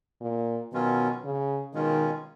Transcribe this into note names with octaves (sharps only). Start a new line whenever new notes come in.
A#2
B2 D#3 F#3 C#4 F4
C#3
B2 D#3 G#3 C#4 F4